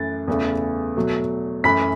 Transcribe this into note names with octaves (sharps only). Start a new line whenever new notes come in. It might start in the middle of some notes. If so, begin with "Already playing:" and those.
Already playing: F#2 E3 A3 A6
E2 C#3 E3 A3
B2 F#3 A3
F#2 E3 A3 B5 B6